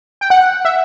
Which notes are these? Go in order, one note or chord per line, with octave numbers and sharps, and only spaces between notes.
G5
F#5
E5